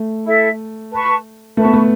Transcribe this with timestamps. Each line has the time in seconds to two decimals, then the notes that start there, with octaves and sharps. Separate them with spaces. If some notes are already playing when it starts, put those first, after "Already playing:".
Already playing: A3
0.24 E4 A4 E5
0.90 B4 A5 C#6
1.56 A3 B4 A5 C#6
1.65 B3
1.74 A3